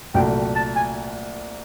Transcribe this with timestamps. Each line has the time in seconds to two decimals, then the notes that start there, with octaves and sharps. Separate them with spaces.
0.14 C2 A#2 F#3 A3 G5
0.56 A5
0.76 G#5